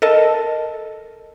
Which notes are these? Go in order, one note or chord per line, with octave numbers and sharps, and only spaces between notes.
A4 A#4 D#5 A5